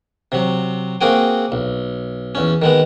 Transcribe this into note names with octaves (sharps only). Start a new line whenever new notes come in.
C3 F#3
A#3 C4 F#4 G#4 G5
B1
E2 C#4
D#3 G#3 B3